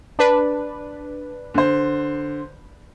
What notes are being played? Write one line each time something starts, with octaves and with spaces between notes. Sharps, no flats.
D4 B4
D3 C5